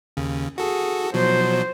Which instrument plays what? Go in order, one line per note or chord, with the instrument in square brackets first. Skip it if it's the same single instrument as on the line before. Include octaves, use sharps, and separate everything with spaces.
[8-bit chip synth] D#2 C#3
[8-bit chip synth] F#4 A4 [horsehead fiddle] G#4
[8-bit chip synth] B2 F3 F#3 [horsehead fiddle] C5